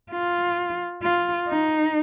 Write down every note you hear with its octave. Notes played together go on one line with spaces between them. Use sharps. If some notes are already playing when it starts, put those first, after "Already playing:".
F4
F4
D#4